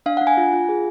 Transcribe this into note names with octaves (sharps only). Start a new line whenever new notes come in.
D4 F5
D4 F#5
G#5
F4
F4
G#4